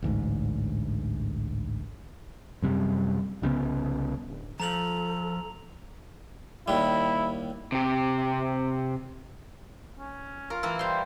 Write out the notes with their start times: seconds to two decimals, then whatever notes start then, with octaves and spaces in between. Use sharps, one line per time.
0.02 A1 D2 G#2
2.62 F#2 C3 G3
3.42 C2 C#3 F#3 B3
4.27 D1
4.60 F3 A4 A#5 F7 F#7
6.68 D#2 G3 E4
7.72 C3 G4
9.98 C#4
10.50 F4 A#4
10.63 E3 A#3 E4
10.79 G3 C5 C6